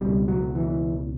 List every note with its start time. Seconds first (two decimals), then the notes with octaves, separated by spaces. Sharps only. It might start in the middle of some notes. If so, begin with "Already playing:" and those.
0.01 C#2 B2 G3
0.28 F#3
0.55 E3